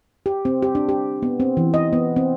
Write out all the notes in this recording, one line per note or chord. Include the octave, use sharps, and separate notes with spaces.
G4
C4
G4
D4
G4
B3
C4
E3
D#5
B3
C4